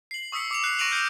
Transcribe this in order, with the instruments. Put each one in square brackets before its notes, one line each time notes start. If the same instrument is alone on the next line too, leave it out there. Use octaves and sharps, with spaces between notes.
[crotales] C7 F#7
C#6 D#6 E6 B6 C#7
D6 C#7 F7
F#6 C7
C#6 A#6 D7 D#7 F7 F#7
F6 G6 C7 C#7 F7